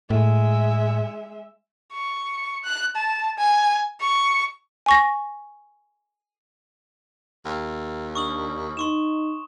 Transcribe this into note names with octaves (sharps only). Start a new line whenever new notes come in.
A2 G#3 E5
C#6
F#6
A5
G#5
C#6
G#5 C#6 A#6
D#2
D4 C#6 D#6 F#7
D#4 C6 C#6 E7